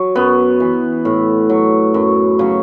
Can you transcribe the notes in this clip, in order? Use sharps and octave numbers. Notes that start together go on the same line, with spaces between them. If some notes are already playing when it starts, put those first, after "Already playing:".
Already playing: F#3
F#2 B3
E3
A2
F#3
F#2
C#3 F#3